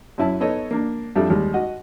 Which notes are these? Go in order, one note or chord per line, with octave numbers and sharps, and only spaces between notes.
F#2 C#4 E4 A5
B3 D#4 A4 C#5 D#5
A#3 D4
F2 G3 D4 A4 E5
D#2 G3 G#3
F#4 D#5 F#5